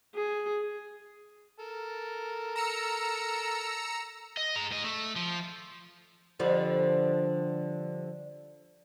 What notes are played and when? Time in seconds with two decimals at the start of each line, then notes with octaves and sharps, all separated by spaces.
0.15 G#4
1.60 A4 A#4
2.56 A#5 E6 C#7
4.37 D#5
4.56 G#4 A#5
4.71 G#2 D#5
4.84 A3
5.16 F3
6.39 D3 F3 G3